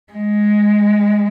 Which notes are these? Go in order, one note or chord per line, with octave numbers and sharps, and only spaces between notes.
G#3